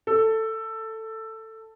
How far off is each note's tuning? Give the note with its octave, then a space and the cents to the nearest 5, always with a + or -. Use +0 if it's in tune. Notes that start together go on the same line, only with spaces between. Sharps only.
A4 +10